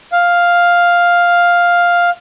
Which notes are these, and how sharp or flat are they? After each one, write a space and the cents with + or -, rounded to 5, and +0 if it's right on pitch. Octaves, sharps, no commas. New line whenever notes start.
F5 +5